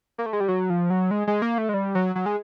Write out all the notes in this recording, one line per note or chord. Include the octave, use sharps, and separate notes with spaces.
A#3
A3
G#3
G3
F#3
F3
F#3
G#3
G#3
A#3
A3
G#3
G3
F#3
F#3
G#3